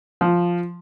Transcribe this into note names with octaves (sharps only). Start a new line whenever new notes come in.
F3